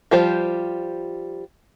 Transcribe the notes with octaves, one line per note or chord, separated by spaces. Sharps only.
F3 G3 F4 G4 C5